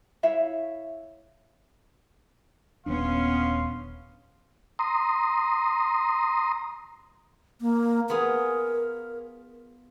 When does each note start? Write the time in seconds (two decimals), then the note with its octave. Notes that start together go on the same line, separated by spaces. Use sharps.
0.23 E4 C#5 E5 F5
2.86 D#1 D#2 B3 C#4 D4 F5 C6
4.79 A#5 C6 D#6
7.61 A#3
8.10 B3 F4 G#4 A#4